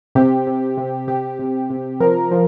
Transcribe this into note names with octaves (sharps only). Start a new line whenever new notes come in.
C3 G4
C3
C3
C3 G4
C3
C3
F3 A#4
F3